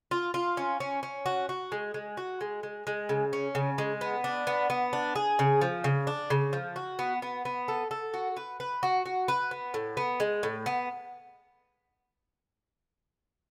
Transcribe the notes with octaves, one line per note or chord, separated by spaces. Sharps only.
F4
F4
C#4
C#4
C#4
F#4
F#4
G#3
G#3
F#4
G#3
G#3
G#3
C#3
C#4
C#3
G#3
B3
D4
B3
B3
D4
G#4
C#3
F3
C#3
D4
C#3
F3
F#4
B3
B3
B3
A4
A4
F#4
B4
B4
F#4
F#4
B4
B3
A2
B3
G#3
A2
B3